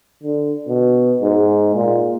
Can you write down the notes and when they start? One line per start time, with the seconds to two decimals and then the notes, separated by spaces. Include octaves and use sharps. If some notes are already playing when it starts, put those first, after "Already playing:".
0.23 D3
0.67 B2
1.22 G#2
1.75 A#2